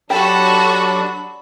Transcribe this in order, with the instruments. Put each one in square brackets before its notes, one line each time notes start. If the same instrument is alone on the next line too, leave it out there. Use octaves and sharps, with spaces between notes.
[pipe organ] F#3 D4 [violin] F#4 A4 [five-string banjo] G4 [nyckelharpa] B5